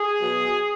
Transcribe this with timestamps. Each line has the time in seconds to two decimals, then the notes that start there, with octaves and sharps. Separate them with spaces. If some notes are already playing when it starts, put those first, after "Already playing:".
Already playing: G#4
0.18 B2 F#3